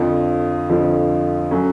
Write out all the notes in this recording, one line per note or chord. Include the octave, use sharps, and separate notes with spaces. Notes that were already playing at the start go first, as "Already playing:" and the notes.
Already playing: F2 D3 F3
F2 D3 F3
F#3 A3 C#4